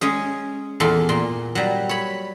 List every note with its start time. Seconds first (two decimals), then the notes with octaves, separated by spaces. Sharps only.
0.01 G#3 C#4 G#4
0.80 E2 A#2 A4 C6
1.09 A#2 C6
1.55 F#3 G3
1.89 C#5 B5